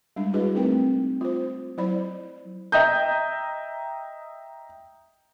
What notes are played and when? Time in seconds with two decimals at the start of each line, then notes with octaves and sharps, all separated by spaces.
0.16 G3 G#3 D4
0.33 D4 E4 F#4 G#4 B4 D#5
0.55 A3 C4 D#4 E4 A#4 G5
1.21 F4 C5
1.78 F#3 E4 C5 D5 B5
2.72 D#5 E5 G5 A#5 D#6 G6